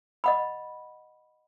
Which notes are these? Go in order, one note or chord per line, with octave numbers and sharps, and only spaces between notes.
D#5 F#5 B5